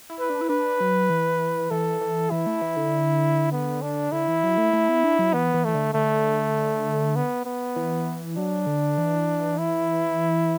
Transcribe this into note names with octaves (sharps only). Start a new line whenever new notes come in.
E4
B4
D4
E4
D4 B4
F#3
E3
E3 A4
E3
E3 E4
A3
E3
D3
B3
D4
D3 E4
E3
F#3
A3
A3
B3
D4
F#3
E3 B3
E3
E3 A3
D3
D3 A3
B3
B3
E3
F#3 D4
D3
E3
E4